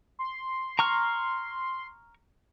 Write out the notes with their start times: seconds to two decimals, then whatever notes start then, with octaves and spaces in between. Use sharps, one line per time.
0.19 C6
0.79 A#5 C#6 F6